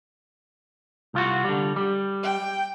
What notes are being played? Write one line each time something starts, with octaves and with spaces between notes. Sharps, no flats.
C2 F4 F#4
D3 G3
G3
G5